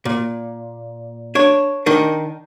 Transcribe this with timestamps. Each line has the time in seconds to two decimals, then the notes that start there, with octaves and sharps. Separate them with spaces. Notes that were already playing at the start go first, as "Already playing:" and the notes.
0.05 A#2
1.35 D4 C#5
1.86 D#3 D4 D#4